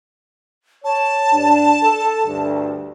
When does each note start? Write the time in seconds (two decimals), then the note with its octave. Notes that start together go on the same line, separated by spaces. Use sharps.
0.84 C#5 A5
1.33 G2 D4
1.82 A4
2.25 D2 G2 D3